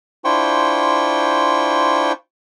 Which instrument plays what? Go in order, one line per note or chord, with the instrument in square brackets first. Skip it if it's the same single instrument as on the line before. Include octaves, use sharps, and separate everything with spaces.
[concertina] D4 E4 F4 C5 G5 C#6